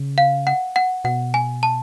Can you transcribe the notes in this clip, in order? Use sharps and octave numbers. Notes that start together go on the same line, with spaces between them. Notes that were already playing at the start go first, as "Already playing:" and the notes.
Already playing: C#3
F5
F#5
F#5
B2 F#5
G#5
A5